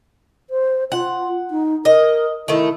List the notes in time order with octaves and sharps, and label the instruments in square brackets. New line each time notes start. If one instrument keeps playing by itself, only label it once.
[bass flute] C5
[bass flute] F4 [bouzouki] F#5
[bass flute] D#4
[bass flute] A#4 [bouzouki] D#5
[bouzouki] D#3 A3 [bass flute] E4